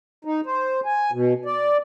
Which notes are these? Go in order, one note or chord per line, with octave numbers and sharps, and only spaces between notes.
D#4
C5
G#5
B2
D5